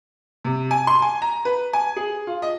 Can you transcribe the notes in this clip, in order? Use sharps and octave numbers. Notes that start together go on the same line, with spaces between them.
C3
G#5
C6
G#5
A#5
B4
G#5
G#4
F4
D#5